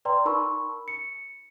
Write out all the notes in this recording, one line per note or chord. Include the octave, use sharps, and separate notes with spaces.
B4 D5 G5 A#5 C6
D#4 A#4 A5 B5 C#6 E6
C#7